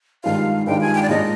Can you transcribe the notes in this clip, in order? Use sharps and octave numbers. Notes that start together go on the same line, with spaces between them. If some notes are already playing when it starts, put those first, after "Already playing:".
G2 D#3 G#3 D4 F4 F5
G2 D#3 G#3 D4 F4 G5
G#5
G5
D5
A#2 G#3 D4 D#5